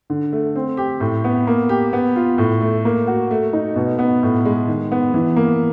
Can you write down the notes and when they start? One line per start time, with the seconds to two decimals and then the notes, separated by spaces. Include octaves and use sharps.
0.10 D3
0.33 A3
0.56 C4
0.77 G4
1.00 A2
1.24 B3
1.47 A#3
1.69 G4
1.93 B3
2.16 F4
2.38 A2
2.61 A3
2.85 A#3
3.07 F#4
3.31 A3
3.53 D#4
3.76 B2
3.99 B3
4.23 A2
4.45 G#3
4.67 D#3
4.92 B3
5.14 E3
5.36 A#3